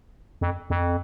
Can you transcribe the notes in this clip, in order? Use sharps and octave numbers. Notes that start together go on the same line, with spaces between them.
F2
F2